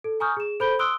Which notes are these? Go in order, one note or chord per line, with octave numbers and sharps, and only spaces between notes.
A4
G#5 A#5 C#6 D#6 F6 G6
G#4 E7
A4 C5 B5 G6 D7 G7
C6 D#6 E6 F#6 D7 G7